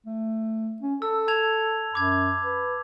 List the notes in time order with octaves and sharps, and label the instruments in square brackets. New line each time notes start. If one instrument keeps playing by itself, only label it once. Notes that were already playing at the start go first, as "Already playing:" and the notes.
[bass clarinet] A3
C#4
[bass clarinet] A4 [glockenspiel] E6
[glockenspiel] A5 G#6 F7
[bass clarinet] F#2 [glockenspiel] B5 D6 G#6
[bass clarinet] B4